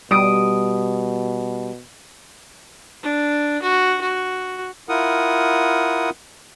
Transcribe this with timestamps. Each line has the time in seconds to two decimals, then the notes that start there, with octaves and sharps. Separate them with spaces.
0.11 B2 G3 D#6 D7 D#7
3.03 D4
3.62 F#4
4.01 F#4
4.89 E4 F4 A#4 F#5 D#6